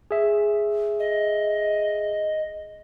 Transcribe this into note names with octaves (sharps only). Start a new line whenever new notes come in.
G#4 E5
D#5